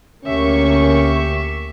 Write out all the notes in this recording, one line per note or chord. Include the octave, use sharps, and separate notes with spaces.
D2 A#3 C#4 G4 E5 C#6